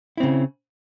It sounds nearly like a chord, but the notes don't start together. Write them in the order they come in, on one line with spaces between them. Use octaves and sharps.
E4 C4 C#3